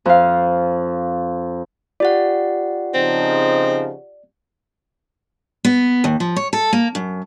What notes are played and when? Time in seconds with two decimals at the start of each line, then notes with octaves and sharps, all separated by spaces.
0.06 F2 F5
2.00 F4 G4 D5 F#5
2.94 C#3 F3 C4 D#4
5.65 B3
6.04 D#2
6.20 F3
6.36 C#5
6.53 A4
6.73 A#3
6.95 F#2